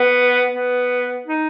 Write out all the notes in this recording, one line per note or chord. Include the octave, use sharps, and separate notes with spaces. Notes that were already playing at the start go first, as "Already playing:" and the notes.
Already playing: B3
B3
D#4